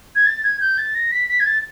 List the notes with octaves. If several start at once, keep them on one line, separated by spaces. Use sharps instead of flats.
G#6
A6
G#6
G6
A6
A#6
B6
B6
G#6
A6